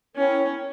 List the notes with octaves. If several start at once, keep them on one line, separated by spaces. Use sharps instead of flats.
C#4 E4 A#4 C#5 G5